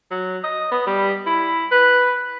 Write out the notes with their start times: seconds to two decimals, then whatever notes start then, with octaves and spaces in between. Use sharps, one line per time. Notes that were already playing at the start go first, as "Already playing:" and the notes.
0.11 F#3
0.44 D#5
0.71 B3
0.86 G3
1.26 E4
1.71 B4